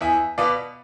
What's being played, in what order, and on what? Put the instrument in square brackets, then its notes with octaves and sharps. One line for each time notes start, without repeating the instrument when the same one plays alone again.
[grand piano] E2 E5 G#5
B2 B3 D5 F5